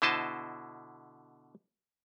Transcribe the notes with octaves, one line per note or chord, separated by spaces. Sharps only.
B2 D3 E4 C5 D#5 A5